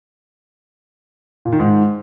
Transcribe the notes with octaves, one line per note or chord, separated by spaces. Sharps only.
A#2
D#3
G#2